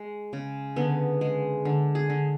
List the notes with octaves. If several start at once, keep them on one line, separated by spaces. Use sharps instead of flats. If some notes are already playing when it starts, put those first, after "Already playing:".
Already playing: G#3
C#3
D3 B3
G#3
D3
G#4
D3